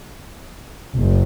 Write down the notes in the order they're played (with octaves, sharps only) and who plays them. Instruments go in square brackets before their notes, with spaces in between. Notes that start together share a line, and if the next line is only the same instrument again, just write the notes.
[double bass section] F#1